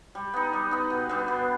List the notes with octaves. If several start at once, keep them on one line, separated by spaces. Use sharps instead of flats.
G3
B3 D#4
G3
B3 D#4
B2
G3 B3 D4
B2